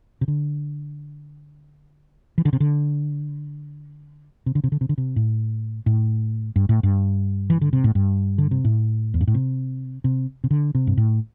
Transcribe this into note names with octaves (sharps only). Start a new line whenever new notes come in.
C3
D3
E3
D3
C3
D3
C3
D3
C3
D3
C3
D3
C3
A2
A2
G2
A2
G2
E3
D3
C3
A2
G2
D3
C3
A2
E2
G2
A2
C3
C3
C3
D3
C3
G2
A2